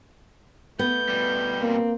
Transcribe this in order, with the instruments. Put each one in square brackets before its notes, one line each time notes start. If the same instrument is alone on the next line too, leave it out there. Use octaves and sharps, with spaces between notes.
[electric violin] A3 G6 [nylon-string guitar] B3
[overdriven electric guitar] B2 G3
[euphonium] A#3 [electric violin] C4